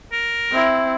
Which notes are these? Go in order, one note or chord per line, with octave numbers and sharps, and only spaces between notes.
A#4
C4 E4